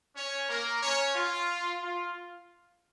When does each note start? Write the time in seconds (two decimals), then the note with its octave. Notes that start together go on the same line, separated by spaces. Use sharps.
0.16 C#4 C#5
0.49 A#3 A#4
0.82 C#4 C#5
1.16 F4
1.82 F4